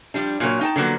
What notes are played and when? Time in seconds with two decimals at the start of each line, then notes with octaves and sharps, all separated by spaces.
0.14 F3 G3 D4
0.40 A#2 F#3 A#3 C#5
0.61 D#4 G5 A5
0.76 D3 F3 F#3 A#3 B3